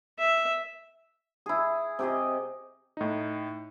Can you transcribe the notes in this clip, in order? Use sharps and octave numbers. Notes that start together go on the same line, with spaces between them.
E5
E4 G#4
C3 G4 G#4 D#5
A2 D#4